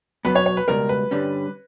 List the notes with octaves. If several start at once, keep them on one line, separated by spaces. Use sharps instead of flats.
B2 F#3 B3 B4
C#5
C#5
B4
C#2 B2 G3 A#4
B4
G2 D3 G3 C#4